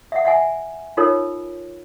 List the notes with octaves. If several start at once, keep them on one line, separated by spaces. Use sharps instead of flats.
E5 F#5
E5 F#5 G#5
D#4 F4 A4 A#4 C#5